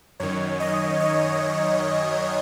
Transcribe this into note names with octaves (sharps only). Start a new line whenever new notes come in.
F#2 D#3 C#5
D#5
C#5